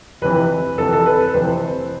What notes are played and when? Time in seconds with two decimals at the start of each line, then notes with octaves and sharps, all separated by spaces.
0.22 F2 C3 E3 B4
0.77 F2 C3 E3 A4
0.93 A4
1.06 B4
1.20 B4
1.34 F2 C3 E3 C5